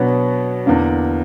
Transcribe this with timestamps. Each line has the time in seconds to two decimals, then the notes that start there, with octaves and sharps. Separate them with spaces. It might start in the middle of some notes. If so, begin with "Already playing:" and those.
Already playing: B2 F#3 B3 D4 C#5
0.66 E2 D3 A#3 D4